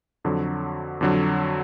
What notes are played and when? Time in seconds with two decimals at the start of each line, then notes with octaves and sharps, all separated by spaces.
0.24 F2 D3 F#3
1.01 F2 D3 F#3